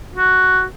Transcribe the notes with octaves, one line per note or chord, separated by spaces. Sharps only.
F#4